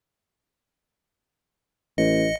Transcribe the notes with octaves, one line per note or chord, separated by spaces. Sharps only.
A1 D#5 C#7